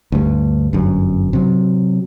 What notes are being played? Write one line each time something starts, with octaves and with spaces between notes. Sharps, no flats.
D2 G2
G1 F#2
C3 F#3